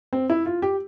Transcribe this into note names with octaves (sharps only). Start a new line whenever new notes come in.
C4
E4
F4
G4